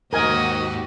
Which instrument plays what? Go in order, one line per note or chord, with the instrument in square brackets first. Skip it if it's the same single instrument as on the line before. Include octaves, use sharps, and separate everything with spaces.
[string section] D#2 F#4 G4 [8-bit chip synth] G#2 [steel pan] A#4 G#5 [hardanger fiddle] D#5